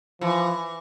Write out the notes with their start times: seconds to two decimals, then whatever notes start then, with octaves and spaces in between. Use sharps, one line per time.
0.21 E3 F3